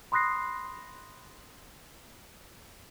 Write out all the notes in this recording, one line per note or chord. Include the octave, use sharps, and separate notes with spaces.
B5 C6 D#6 F#6 A#6 C7